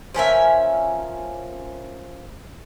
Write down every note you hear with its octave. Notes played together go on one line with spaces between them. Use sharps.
F3 C#4 A#4 E5